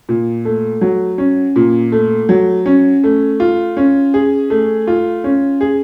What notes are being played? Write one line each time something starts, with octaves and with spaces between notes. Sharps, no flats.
A#2
A3
F#3
C#4
A#2
A3
F#3
C#4
A3
F4
C#4
G#4
A3
F4
C#4
G#4